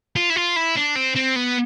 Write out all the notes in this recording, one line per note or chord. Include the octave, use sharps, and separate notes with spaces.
F4
E4
F4
E4
D4
C4
C4
B3